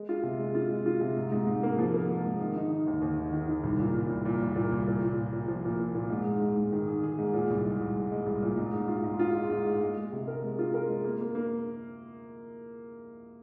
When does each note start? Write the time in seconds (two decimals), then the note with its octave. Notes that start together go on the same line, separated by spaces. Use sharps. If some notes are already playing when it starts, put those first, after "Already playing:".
Already playing: G#3
0.09 F4
0.23 C3
0.39 G#3
0.55 F4
0.70 G#3
0.86 F4
1.01 C3
1.17 G#2
1.32 G#2
1.47 G#2
1.63 A#3
1.78 F3
1.94 A#3
2.09 A#3
2.25 G#2
2.40 D#3
2.56 D#4
2.70 D#4
2.87 D#2
3.02 D#2
3.18 D#4
3.33 D#3
3.48 D#3
3.63 C2
3.79 A#2
3.95 A#2
4.10 C2
4.25 A#2
4.41 C2
4.56 A#2
4.72 C2
4.88 A#2
5.03 A#2
5.18 A#2
5.33 A#2
5.48 F3
5.65 A#2
5.79 A#2
5.95 A#2
6.10 G#2
6.25 G#2
6.42 G#2
6.57 G#2
6.72 D#3
6.88 G#4
7.03 G#4
7.18 G#2
7.33 A#2
7.50 C2
7.65 G#3
7.80 C2
7.96 G#3
8.12 G#3
8.26 C2
8.42 A#2
8.58 G#2
8.73 G#2
8.88 F4
9.04 G#2
9.19 F4
9.34 G#3
9.50 G#2
9.65 G#3
9.81 G#3
9.97 G#3
10.13 C3
10.28 A#4
10.44 G#3
10.59 F4
10.74 A#4
10.89 G#3
11.04 A#3
11.21 A#3
11.35 A#3